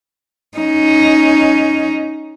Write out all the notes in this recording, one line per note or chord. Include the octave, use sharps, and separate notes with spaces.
C#4 D#4